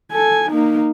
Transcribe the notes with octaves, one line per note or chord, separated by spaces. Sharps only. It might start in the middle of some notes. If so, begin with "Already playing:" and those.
A4 G#5
A#3 D#4